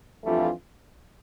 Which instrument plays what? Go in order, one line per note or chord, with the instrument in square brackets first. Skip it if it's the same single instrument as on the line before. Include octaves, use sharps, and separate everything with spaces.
[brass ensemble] F2 E3 G3 D4 F4 [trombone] A3